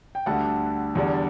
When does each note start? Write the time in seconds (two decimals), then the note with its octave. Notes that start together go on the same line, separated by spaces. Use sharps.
0.15 G5
0.26 D2 D3 G3 D4 F#5 A5
0.95 E2 D3 G3 D4